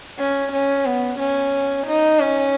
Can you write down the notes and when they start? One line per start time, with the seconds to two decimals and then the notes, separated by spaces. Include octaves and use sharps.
0.19 C#4
0.52 C#4
0.85 B3
1.19 C#4
1.87 D#4
2.20 C#4